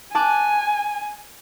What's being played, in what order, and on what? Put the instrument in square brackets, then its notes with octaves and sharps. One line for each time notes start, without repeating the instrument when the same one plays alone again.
[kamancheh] G#5 [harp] A5 D6 F#6